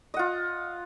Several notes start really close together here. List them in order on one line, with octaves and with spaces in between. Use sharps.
D#5 F#5 F4